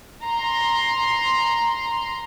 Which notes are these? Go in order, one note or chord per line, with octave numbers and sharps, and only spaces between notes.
A#5 C6